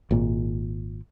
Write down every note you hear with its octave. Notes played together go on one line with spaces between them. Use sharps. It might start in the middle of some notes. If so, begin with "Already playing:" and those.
G#1 A#2